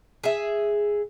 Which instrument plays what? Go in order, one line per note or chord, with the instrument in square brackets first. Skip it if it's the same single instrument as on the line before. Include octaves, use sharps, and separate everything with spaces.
[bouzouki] G#4 E5